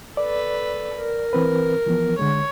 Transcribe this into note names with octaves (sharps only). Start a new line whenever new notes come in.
A4 B4 D5
A#4
E3 C4 B4
E3 F3 B3
D3 G#3 C#5